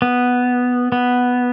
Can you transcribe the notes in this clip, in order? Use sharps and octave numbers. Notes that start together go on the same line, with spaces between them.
B3
B3